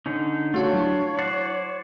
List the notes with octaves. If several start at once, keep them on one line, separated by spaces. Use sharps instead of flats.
D3 C#4 D#4
A3 D4 F4 F#4 C#5
F#3 E4
C5 D5 F#5